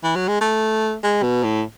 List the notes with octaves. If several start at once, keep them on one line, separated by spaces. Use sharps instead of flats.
E3
F#3
G#3
A3
G#3
B2
A2